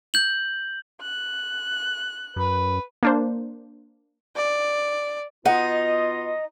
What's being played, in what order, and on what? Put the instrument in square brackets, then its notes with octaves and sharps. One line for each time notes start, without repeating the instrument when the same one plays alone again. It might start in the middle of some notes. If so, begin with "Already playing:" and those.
[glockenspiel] G6 F#7
[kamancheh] F#6
[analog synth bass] F#2 [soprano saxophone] B4
[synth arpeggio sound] A#3 D4 C5
[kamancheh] D5
[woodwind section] B2 B3 F4 [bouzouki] D#4 [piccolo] D#5 [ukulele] F#5